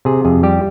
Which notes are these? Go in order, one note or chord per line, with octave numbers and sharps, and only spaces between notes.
C3 G#4
F2 G#4
G3 G4